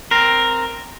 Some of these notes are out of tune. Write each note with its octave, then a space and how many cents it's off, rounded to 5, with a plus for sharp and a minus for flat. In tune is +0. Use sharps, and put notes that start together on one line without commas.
C4 +0 A#4 +0